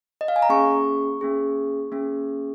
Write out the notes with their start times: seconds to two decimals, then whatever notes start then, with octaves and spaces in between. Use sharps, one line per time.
0.21 D#5
0.28 F5
0.36 G#5
0.42 A#5
0.49 A#3 C#4 G#4 C#6
1.21 A#3 C#4 G#4
1.92 A#3 C#4 G#4